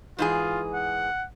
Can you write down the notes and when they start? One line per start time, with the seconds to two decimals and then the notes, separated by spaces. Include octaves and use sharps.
0.19 G#2 E3 F4 G#4
0.74 F#5